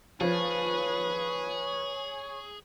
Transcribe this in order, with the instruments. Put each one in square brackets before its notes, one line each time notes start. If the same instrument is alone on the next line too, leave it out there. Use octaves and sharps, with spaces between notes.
[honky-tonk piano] F3 [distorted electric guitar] G#4 [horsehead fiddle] B4 [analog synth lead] C#5